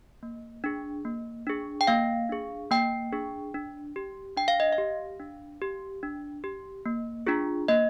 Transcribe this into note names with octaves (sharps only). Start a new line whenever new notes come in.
A#3
D4 G#4
A#3
D4 G#4
G5
A#3 F5
D4 G#4
A#3 G5
D4 G#4
D4
G4
D4 G5
F5
D#5
F5
G4
D4
G4
D4
G4
A#3
D4 F4 G#4
A#3 D#5